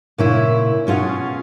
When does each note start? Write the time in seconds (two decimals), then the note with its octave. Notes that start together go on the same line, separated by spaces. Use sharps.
0.18 A#2 C#3 E4
0.87 B2 C#4 F4 G#4 F#5